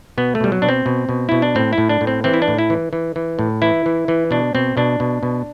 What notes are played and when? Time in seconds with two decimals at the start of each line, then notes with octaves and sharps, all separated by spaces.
0.17 B2 B3
0.35 A3
0.40 B2 G3
0.52 F#3
0.62 B2 D4
0.69 C4
0.86 B2
1.09 B2
1.29 B2 E4
1.42 D4
1.55 A2 C4
1.73 E4
1.78 A2
1.89 D4
2.01 A2
2.07 C4
2.24 E3 C4
2.34 E4
2.42 D4
2.48 A2
2.58 E4
2.70 E3
2.93 E3
3.16 E3
3.39 A2
3.62 E3 E4
3.86 E3
4.08 E3
4.31 B2 D4
4.55 B2 C4
4.77 B2 D4
5.00 B2
5.23 B2